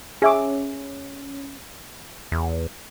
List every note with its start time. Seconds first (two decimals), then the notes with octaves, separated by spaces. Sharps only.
0.22 C#4 G#4 E5 D6
2.32 E2